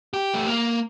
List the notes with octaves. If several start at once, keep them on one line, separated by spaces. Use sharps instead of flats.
G4
A3
A#3